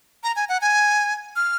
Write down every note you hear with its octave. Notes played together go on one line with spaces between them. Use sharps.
A#5
G#5
F#5
G#5
F6